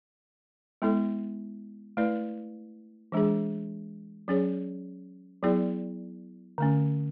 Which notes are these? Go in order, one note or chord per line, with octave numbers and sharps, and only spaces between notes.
G#3 B3 E4 A4
A3 E4 B4 D5
E3 G#3 D4 G#4
F#3 C#4 G#4 C#5
F#3 B3 E4 G#4 D5
D3 A3 C#4